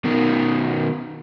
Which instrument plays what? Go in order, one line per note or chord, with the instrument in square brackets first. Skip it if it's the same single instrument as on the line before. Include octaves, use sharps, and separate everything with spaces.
[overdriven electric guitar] B2 D#3